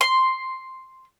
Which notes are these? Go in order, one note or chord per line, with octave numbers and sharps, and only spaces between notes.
C6